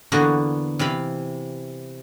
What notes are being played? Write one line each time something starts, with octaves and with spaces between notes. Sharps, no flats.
E2 D3 A#3 B3 F#4 G#5
C3 E3 F5 B5